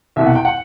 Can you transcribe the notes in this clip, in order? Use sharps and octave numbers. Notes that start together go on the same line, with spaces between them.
C2 B2 E5
F#5
G5
F#5